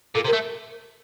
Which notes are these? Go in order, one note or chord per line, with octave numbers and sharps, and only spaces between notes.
A#2 A4
C3 A#4
A3